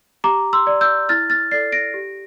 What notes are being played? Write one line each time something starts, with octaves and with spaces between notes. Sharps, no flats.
G4 A#5 D6
C6 E6
D5
E6 G6
E4 F6 A6
F6 A6
A4 D5 A6 C7
A#6 D7
G4